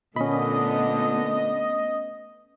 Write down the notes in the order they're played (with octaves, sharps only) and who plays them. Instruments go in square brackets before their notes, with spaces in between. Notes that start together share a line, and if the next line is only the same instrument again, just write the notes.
[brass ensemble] A#2 D3 [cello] A3 B3 [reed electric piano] C#4 B5 [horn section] D#5